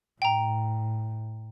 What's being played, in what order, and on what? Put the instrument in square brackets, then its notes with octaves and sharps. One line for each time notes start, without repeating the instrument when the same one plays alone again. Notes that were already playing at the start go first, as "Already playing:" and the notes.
[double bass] A2 [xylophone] G5 A#5